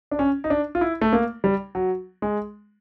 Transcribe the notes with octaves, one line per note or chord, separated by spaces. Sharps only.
D4
C#4
D#4
D4
F4
E4
A3
A#3
G3
F#3
G#3